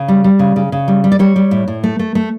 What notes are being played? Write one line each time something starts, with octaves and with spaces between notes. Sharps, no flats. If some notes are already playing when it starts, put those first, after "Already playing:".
Already playing: C#3
G3
G3
C#3
C#3
C#3
G3
G3
D5
G3 C#5
G3
A2
A2
A3
A3
A3